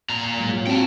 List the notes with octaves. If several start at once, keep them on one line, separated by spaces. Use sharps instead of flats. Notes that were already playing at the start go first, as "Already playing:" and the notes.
A#2 A#5
G#2 F#3
F#3 F4
C4 F#4 F5 G5 A5